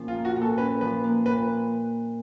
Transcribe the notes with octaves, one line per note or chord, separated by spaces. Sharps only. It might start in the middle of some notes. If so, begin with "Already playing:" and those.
Already playing: A#2 F3 C#4
F4
A#3
F#4
A#2
A4
C#4 B4
F3 B4
A#3
A#2 B4